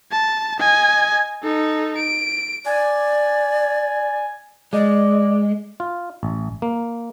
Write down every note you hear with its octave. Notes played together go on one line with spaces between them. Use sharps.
A5
D#5 G#5
D#4 A4
D7
D5 G#5
G#3 D5 D#5
F4
A1
A#3